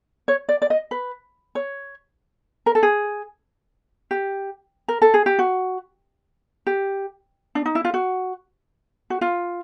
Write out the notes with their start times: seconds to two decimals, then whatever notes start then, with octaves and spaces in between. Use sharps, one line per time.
0.28 C#5
0.49 D5
0.62 D5
0.70 D#5
0.91 B4
1.55 C#5
2.66 A#4
2.75 A4
2.83 G#4
4.11 G4
4.88 A#4
5.02 A4
5.14 G#4
5.26 G4
5.39 F#4
6.67 G4
7.55 D4
7.66 D#4
7.75 E4
7.85 F4
7.94 F#4
9.10 F#4
9.21 F4